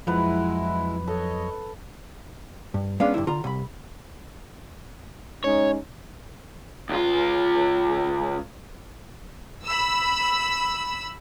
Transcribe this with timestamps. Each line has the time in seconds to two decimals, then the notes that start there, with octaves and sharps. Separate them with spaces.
0.07 F2 F3 F#3 G#3 E4 B4 F#5
1.07 A4 C#5 D#5
2.74 G2
3.00 G#3 B3 C#4 D4 F5
3.14 G2 B2 D3 E4
3.27 D3 F4 A#5
3.44 C2 B5
5.44 G#3 C#4 D#4 C#5
6.89 C#2 F4
9.66 B5 E6